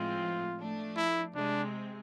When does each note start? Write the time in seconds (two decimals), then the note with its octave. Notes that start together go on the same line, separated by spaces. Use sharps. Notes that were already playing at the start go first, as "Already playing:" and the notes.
Already playing: A2 F3 G#3 C4 F4
0.57 F3 A3 D4
0.96 E4
1.35 C3 G#3 C4 D4